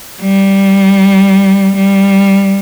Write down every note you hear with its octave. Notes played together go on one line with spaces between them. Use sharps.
G3
G3